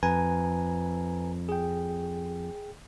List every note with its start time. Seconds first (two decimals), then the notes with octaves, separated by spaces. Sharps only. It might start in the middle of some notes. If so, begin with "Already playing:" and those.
0.03 F2 B4 G#5 A#5
1.49 G#4 G5